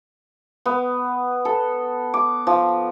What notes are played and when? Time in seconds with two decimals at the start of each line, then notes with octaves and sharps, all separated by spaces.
0.66 B3
1.45 A4
2.14 D6
2.47 F3